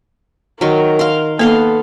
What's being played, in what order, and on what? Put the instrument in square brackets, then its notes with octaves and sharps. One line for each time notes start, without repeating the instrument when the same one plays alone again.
[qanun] D#3 F#3 [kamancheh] A#4
[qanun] F5 C6
[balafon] A#3 [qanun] B3 F5 C6 [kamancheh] A4